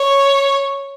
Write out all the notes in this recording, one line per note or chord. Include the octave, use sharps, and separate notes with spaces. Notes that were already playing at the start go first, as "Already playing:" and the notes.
Already playing: C#5